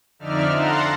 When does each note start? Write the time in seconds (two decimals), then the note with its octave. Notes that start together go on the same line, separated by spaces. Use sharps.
0.19 F2 D3 D#4 D5 E5 F6
0.55 F5 F#5 A5 A#5 C6